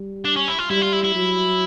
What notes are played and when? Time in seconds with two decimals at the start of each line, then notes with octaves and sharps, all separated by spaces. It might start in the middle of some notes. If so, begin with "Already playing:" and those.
Already playing: G3
0.25 D4
0.36 C#4
0.48 E4
0.59 F4
0.70 G3 E4
0.82 F4
0.93 E4
1.04 E4
1.15 F#3